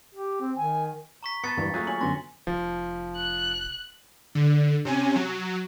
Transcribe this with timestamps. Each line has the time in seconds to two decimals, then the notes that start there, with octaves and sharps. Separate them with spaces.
0.14 G4
0.41 C4
0.57 D#3 G#5
1.23 A#5 C#6 B6
1.44 B3 B4 A5 A6 B6 C#7
1.57 G2 E3 A6
1.74 F#3 A3 A#3 F4 G#4
1.87 C#5 G#5 F#7
2.01 F#2 D3 B3 C6 A#6
2.47 F1 F3
3.16 F#6
4.35 D3
4.85 C3 C#4 G#5
5.16 F#3